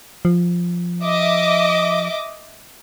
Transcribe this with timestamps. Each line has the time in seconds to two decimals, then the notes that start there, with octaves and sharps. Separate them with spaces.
0.25 F3
1.03 D#5 E5 D6